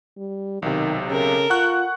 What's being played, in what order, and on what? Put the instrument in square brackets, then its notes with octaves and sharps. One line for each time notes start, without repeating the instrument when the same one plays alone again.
[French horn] G3
[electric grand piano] B1 C3 [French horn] D#3
[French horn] C#3 [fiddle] A4 A#4
[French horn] F4 [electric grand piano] F#5 C#6 F#6